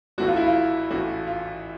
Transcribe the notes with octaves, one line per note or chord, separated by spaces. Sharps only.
A1 A2 E3 A3 F#4
F4
E4
F4
A1 A2 E3 A3 F#4
F4